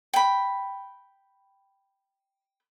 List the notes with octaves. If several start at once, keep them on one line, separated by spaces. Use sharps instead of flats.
G5 B5